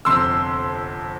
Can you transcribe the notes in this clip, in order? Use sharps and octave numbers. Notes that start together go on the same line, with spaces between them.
G1 F2 C3 C6 E6